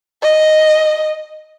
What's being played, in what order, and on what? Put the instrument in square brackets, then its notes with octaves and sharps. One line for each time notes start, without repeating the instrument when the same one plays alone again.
[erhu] D#5